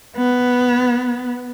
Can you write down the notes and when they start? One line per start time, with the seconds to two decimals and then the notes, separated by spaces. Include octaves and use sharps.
0.16 B3